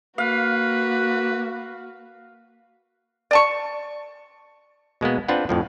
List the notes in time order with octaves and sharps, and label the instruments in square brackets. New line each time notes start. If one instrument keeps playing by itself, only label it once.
[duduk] A#3 [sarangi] F#4 [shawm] B4 [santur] F5
[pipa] D5 A5 C#6
[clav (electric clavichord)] B2 G#3 A#3 B3
C4 D4 F4 B4 F#5
F2 A2 F3